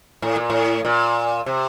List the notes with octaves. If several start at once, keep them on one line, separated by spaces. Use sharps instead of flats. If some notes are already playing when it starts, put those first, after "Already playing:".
A2
A#2
A2
A#2
C3